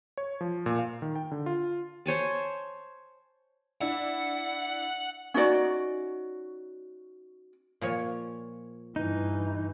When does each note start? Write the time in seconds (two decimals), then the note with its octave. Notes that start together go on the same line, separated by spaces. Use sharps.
0.17 C#5
0.41 F3
0.66 A#2
0.79 F5
1.02 D#3
1.15 G5
1.31 D3
1.46 F4
2.06 C5 C#5 G#5 A5
3.81 D4 E4 F#5
5.34 C#4 D#4 F#4 D5
7.81 A#2 F3 C#5
8.96 G2 E3 D#4